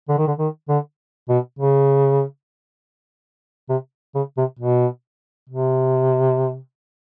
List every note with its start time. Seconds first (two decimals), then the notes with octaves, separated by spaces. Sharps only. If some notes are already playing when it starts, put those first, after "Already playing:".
0.09 D3
0.18 D#3
0.27 D3
0.39 D#3
0.69 D3
1.29 B2
1.59 C#3
3.69 C3
4.15 C#3
4.37 C3
4.59 B2
5.50 C3